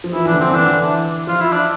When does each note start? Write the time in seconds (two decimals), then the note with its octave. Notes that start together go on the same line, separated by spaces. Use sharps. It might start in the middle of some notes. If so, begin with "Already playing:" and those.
0.04 F3
0.13 E3 E4
0.26 E3 D4
0.32 D3
0.40 C4
0.51 E3
0.54 D3 D4
0.68 E3
1.27 F3 F4
1.41 E4
1.53 D4